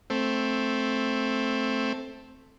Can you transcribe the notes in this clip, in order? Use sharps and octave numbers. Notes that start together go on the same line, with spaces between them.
A3 C4